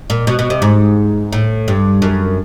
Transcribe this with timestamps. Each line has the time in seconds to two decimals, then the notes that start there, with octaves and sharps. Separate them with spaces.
0.10 A#2
0.27 B2
0.39 B2
0.50 C3
0.62 G#2
1.33 A2
1.68 G2
2.02 F#2